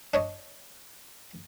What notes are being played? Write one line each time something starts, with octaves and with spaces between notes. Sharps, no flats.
D4 C#5 D#5